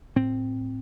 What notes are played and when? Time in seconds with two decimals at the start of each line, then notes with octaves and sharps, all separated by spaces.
0.16 A2 C4